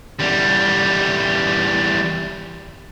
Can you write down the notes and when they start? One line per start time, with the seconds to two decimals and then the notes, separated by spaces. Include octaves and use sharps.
0.20 E2 G3